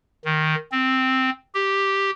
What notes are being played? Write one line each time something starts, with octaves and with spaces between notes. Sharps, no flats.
D#3
C4
G4